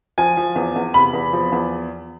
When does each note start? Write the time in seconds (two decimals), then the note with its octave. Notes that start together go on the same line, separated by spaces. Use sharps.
0.18 F3 G#5
0.37 F3
0.56 E2
0.76 E2
0.94 C3 B5
1.13 E2
1.33 F3
1.52 E2